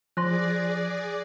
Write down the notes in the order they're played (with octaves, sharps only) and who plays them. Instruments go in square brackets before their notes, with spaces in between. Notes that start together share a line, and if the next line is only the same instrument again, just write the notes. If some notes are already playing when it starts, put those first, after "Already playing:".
[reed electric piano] F3 [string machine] G#4 D5 [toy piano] C5 A5 C6 [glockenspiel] F#6 A#6